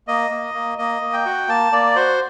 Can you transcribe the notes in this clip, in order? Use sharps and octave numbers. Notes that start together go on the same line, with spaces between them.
A#3 D#5
A#3
A#3
A#3 D#5
A#3
G5
F#4
A#3 A5
A#3 D5
F#4 C5